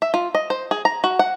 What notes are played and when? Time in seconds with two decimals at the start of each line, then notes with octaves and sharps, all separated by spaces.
0.02 E5
0.14 F4
0.35 D#5
0.50 C5
0.71 G#4
0.85 A#5
1.04 F#4
1.19 F#5